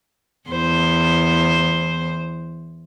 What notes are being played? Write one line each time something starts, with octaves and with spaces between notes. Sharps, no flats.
E2 C5